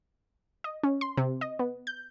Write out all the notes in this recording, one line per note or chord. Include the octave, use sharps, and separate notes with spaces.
D#5
C#4
C6
C3
D#5
B3
G6